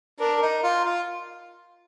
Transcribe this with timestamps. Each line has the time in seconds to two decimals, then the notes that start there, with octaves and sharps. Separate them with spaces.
0.20 D4 A#4
0.42 D#4
0.63 F4
0.85 F4